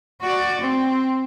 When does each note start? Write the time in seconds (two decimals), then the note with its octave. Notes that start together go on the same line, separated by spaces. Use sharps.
0.21 F#4 D5
0.61 C4